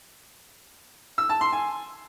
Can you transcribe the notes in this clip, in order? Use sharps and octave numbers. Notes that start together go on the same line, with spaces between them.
E6
A5
C6
G#5